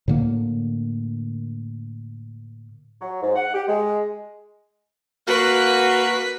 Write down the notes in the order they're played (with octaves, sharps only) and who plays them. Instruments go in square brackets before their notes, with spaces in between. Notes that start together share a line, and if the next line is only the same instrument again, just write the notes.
[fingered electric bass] A2 D3 A#3
[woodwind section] F#3
G#2
F#5
G4
G#3
[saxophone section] A#3 F#4 [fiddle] B4